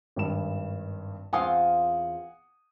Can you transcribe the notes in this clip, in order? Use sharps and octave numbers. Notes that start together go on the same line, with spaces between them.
G#1 G2 E7
E2 C4 F4 F#5 G#5 D#6